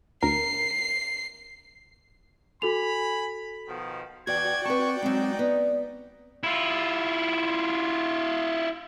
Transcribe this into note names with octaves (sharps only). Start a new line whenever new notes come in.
D2 A#4 C7
F#4 A4 G#5 B5 F7
B2 D#3 F3
E2 F#4 D5 G5 G#6
C4 B4 A5 C#6
F#3 G#3 C4 D#4
B3 D5
E4 F4